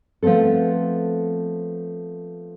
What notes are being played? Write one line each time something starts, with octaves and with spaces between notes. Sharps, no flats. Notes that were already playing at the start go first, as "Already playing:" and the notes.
F3 A3 B3 C4 A4